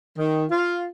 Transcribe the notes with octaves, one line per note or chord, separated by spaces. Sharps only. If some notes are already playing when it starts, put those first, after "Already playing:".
D#3
F4